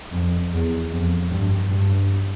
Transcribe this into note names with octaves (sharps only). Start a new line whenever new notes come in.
F2
E2
F2
G2
G2